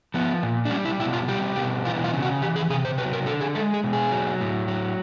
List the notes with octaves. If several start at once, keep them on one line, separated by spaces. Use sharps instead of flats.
F3 B3
A#2
D4
G3 C#4
E4
B2 E4
F4
G3 G4
B2 G4
E3 F4
F4
C#3
F#4
E3 G4
G#4
C3 G#4
C5
F#3 B4
A#4
D3 A4
G#4
G#3 A4
G#4
B2
G#4
F#3
A2
F#3